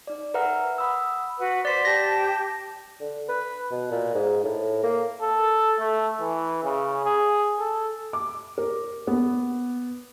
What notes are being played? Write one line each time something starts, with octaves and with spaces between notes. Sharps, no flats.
D#4 D5
A#4 B4 E5 F#5 A#5 F6
F#5 B5 D#6 E6
F#4 B4 F#5
C5 D5 B6
G4 A5 A#6
D3
B4
B2
A#2
G#2
A2
A#3
A4
A3
E3
C#3
G#4
A4
D6
A#4
B3